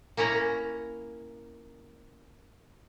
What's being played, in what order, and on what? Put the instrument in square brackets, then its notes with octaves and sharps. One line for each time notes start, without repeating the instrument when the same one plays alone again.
[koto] A#3 C#4 E4 A#5